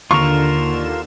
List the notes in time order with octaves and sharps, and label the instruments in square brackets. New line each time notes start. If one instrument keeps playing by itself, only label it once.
[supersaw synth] D#2 D3 E7 [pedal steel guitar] F4 A#4 [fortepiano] C#6